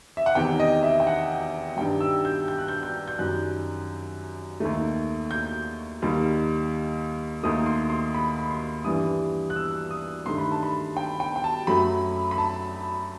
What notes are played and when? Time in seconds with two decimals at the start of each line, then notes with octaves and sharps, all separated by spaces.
0.17 E5
0.26 F#5
0.35 E2 C3 D#3 G5
0.60 D#5
0.83 E5
1.00 G5
1.07 F#5
1.77 G2 D#3 G3 G5
2.01 E6
2.25 G6
2.48 G6
2.58 F#6
2.68 G6
2.83 G6
3.08 G6
3.18 F#2 D#3 G3 F#6
4.60 D#2 D#3 A3
5.31 G6
6.02 D#2 D#3 G3
7.43 D#2 D#3 A3 D#6
7.66 C6
7.90 C6
8.15 B5
8.39 B5
8.50 C6
8.85 G2 E3 G3 D#6
9.50 F#6
9.56 E6
9.91 D#6
10.26 G2 D#3 A3 C6
10.38 B5
10.52 A5
10.63 B5
10.97 G5
11.20 G5
11.36 G5
11.44 A5
11.67 F#2 F#3 A3 B5
12.31 B5
12.38 A5